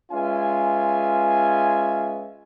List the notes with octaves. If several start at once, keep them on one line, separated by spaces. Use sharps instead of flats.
G#3 C#4 F4 B4 E5 G#5